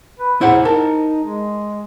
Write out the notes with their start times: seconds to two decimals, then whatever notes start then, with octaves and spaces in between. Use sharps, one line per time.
0.19 B4
0.41 E4 G#4 C5 F#5
0.65 D#4 A#4 A5
1.23 G#3